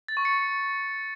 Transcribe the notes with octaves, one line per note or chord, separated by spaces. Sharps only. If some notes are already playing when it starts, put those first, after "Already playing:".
A6
C#6
C#7